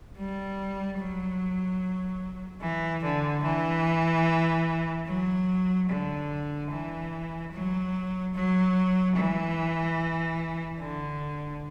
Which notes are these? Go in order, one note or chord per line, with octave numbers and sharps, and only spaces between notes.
G3
F#3
E3
D3
E3
F#3
D3
E3
F#3
F#3
E3
D3